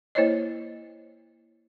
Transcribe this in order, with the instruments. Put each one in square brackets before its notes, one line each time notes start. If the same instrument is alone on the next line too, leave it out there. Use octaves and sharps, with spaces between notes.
[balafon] A#3 E4 C5 C#5 D#5